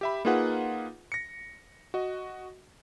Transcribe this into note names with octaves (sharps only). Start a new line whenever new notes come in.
G4 E5 B5
A#3 D#4 F4 G#4 B4 F#5
A#6 C#7
F#4 D#5